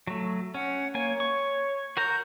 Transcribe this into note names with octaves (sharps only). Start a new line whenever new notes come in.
F#3 A3
C#4 F#5
A#3 C#5 G#5
C#6
F#4 A#4 A#5 G6